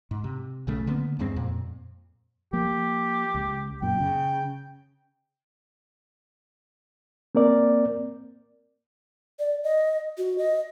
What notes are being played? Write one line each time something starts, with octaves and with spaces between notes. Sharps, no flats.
G#2
C3
B1 C#3 A3
D3 A#3 B3
E2 G2 G#3 C4
F2 A#2
F3 A#3 G4
C#2
F#2 A#2 G5
C#3
A#3 C4 A#4 D5
D5
D#5
F#4
D#5